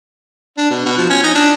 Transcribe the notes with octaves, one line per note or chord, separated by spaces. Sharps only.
D4
B2
B2
F3
C#4
D#4
D4